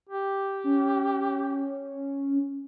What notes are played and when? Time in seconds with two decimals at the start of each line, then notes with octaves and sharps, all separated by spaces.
0.09 G4
0.64 C#4